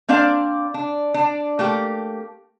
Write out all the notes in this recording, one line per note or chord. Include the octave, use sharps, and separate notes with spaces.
A#3 C4 D4 D5 F5
D4
D4
A3 A#3 G4